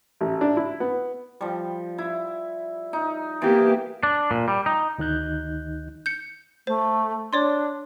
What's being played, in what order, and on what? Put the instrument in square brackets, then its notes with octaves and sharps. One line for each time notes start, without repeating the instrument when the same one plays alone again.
[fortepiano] A1
D4
E4
B3
[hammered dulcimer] F3 G3
E4
D#4
[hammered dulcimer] E3 B3 [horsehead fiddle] A#3 G4
[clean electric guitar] D4
A#2
G3
D#4
[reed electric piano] D2 D#3 D#4 F#6 G6
[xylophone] G6 C#7
[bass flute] A3 [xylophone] C5
[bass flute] D4 [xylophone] C#5 D5 C6